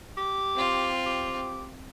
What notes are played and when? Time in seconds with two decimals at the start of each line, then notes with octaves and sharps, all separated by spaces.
0.17 G4
0.55 C4 F4
1.06 G4